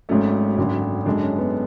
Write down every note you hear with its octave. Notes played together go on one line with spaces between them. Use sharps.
G#1 G#2 F#3 A3 C#4
G#1 F#2 D3
F#2 D3 G#3 D4
C#4
B3